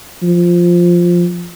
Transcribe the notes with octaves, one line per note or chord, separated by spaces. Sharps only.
F3